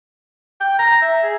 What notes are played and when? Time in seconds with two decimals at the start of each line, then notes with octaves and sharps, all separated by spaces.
0.61 G5
0.79 A#5
1.02 E5
1.23 G#4